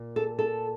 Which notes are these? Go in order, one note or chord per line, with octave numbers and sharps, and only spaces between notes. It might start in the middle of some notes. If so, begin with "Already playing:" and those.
Already playing: A#2
A4
A4